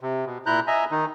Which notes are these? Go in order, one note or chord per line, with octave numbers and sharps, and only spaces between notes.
C3
B2
A#2 E4 A#5 F#6 G6
D#5 E5 G#5 A#5
D#3 D#4